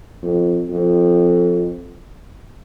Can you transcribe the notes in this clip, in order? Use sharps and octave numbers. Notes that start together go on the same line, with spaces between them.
F2
F2